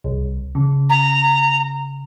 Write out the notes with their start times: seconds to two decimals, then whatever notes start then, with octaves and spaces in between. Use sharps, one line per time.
0.04 C2
0.55 C#3
0.90 A#5